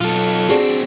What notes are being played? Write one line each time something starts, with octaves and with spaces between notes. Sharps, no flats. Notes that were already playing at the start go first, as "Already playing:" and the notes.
B1 F4 A4
C4 D4 F#4 G#4 D5